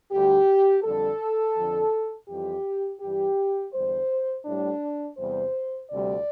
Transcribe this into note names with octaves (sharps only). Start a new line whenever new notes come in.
D2 D3 G3 G4
F2 D3 G3 A4
F2 D3 F3
F2 E3 G3 G4
G2 E3 G3 G4
E2 D3 G3 C5
A2 G3 D4
E2 C3 G3 C5
D2 C3 G3 D5